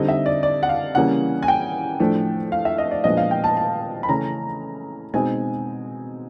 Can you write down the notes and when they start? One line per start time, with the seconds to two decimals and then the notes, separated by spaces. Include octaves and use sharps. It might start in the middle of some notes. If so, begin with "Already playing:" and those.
Already playing: D3 G3 C4 D#4 D#5
0.08 E5
0.26 D5
0.43 D5
0.63 F#5
0.69 F5
0.95 C#3 E3 G3 A#3 C#4 F#5
1.43 G#5
1.48 G5
2.00 A2 F3 A3 D4
2.52 F5
2.65 E5
2.78 D#5
2.91 D5
3.04 A#2 F3 G#3 B3 D4 D#5
3.17 F5
3.31 G5
3.44 A5
3.57 A5
4.03 B5
4.09 C#3 E3 A3 C#4 A#5
5.14 B2 G#3 C4 D#4 G#5